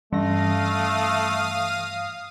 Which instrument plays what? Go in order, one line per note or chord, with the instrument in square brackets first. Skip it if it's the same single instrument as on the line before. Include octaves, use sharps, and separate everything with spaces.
[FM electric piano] G2 A#6 [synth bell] E3 [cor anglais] A3 [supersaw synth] F5 D#6